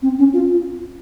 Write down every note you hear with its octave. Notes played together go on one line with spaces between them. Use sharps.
C4
C#4
F4